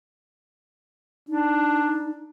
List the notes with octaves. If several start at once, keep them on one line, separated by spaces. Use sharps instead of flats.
D4 D#4